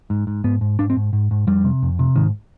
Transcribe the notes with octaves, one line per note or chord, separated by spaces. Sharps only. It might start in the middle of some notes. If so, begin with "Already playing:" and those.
G#2
G#2
G#2 B3
G#2
G#2 D4
C4
G#2
G#2
G#2
F2 G3
C3
F2
C3
G#2 D#3